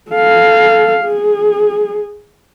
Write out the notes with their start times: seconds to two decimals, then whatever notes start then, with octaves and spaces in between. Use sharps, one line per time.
0.11 A4 F5
1.04 G#4